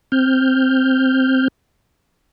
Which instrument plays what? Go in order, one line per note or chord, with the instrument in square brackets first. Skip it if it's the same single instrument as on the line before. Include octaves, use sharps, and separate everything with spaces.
[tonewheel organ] C4 F6 G6